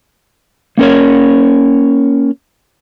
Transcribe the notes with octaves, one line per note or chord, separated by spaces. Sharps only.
A#3 C#4 A#4 C#5